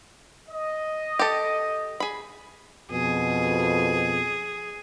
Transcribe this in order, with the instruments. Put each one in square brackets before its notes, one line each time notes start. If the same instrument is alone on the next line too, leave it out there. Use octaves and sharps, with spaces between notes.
[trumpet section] D#5
[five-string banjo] G4 A4
G#4 B5
[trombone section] F2 B2 [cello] G#4